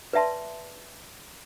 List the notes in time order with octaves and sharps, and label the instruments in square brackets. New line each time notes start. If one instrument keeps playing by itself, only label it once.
[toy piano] B4 D5 E5 A5 C6